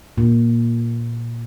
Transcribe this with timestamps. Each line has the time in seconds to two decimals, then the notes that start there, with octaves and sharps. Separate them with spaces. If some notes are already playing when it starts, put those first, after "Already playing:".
0.18 A#2